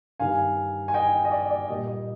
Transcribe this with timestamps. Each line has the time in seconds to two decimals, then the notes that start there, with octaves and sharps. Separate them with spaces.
0.20 G2 D#3 G3 F5 G#5
0.88 G#5
0.94 D#5 G5
1.25 D#5
1.32 D5
1.50 D5
1.69 A#2 G3 A#3 D#5
1.88 D#5